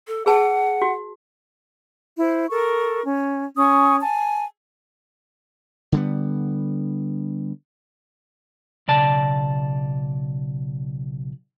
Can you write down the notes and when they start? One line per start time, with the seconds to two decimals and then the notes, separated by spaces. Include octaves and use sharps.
0.08 A4
0.26 G#4 B4 F#5 A5
0.82 F#4
2.18 E4 C5
2.49 A4 A#4 C#6
3.04 C#4
3.58 C#4 G#5 C#6 D#6
4.01 G#5 A5
5.92 D3 G3 B3
8.88 B1 C#3 D5 A5